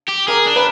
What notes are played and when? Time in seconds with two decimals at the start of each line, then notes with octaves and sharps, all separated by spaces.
0.09 G4
0.28 G#4 A#4
0.47 D4
0.56 B4